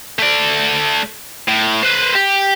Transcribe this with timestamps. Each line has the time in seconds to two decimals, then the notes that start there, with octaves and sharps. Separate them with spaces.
0.19 A3 D5
1.48 A2
1.83 B4 C5
2.15 G4